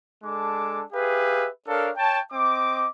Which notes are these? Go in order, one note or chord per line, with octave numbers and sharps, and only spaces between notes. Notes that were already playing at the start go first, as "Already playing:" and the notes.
G#3 D4 A4 A5 D6
G4 G#4 B4 E5 F5
D4 A4 A#4 C#5 F5
C#5 G5 A5
C4 D#5 D6